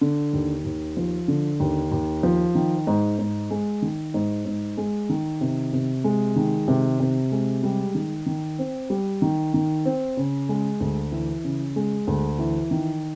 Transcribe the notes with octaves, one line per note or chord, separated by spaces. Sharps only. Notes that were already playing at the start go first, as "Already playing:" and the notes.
D3
D#2
D#2
F3
D3
D#2
D#2
F3
D#3
G#2
G#2
G#3
D#3
G#2
G#2
G#3
D#3
C3
C3
G#3
D#3
C3
C3
G#3
G3
D#3
D#3
C4
G3
D#3
D#3
C4
C#3
G#3
D2
E3
C#3
G#3
D2
E3
D#3